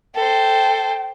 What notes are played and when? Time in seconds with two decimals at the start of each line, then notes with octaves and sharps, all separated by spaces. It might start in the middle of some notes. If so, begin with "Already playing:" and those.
0.15 A4 C5 G5